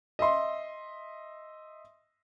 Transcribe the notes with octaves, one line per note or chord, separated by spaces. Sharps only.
D#5 E5 C6